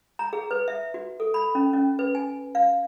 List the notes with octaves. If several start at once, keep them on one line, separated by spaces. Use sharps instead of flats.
A#5
G#4
B4
E5
F#4
A4
B5
C#4
C#4
B4
G#5
F5